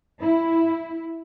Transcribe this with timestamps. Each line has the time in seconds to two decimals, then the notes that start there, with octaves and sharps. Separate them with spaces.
0.21 E4